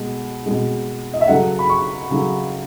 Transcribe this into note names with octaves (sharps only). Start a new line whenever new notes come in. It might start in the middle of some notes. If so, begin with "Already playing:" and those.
Already playing: B2 G#3
B2 G#3
D#5
E5
C#3 F#3 A3 F#5
B5
C#6
C#3 F#3 A3